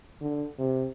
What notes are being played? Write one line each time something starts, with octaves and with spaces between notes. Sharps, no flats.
D3
C3